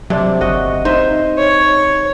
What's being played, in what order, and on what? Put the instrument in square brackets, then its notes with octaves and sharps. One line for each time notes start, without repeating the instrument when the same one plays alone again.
[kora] C3 C4 D4 [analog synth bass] F#3
[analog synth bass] G1 [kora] F#4 D#5
[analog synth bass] D#4 [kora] C5 D#5 E5
[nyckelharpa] C#5